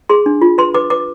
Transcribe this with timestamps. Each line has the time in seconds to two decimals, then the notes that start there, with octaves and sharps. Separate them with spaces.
0.09 G#4 C6
0.26 D4
0.41 F4
0.58 B4 C6
0.74 B4 D6
0.90 B4 D6